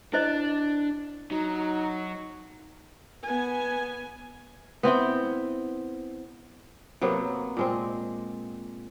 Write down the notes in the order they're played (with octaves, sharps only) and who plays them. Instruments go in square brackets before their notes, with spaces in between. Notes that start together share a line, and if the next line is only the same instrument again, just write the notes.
[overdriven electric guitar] D4 [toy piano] E4 C5 D#5
[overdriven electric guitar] F#3 [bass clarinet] D#4
[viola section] B3 G#5
[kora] B3 C4 E4 G5
C3 F#3 A#3 B3
A#2 G#3 C4